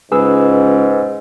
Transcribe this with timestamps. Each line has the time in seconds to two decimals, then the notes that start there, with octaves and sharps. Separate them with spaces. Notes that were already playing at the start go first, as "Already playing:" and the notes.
0.12 C#2 G#2 G#4 B4 E6